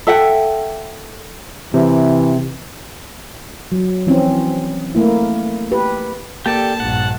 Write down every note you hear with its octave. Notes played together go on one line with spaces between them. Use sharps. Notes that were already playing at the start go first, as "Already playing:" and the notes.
A4 E5 F#5 G5
C3 E3
F#3
E3 F3 C4 C#4
A3 A#3 E4
G4 B4
A#3 G4 A4 D5 A5
A#1 G2 F#5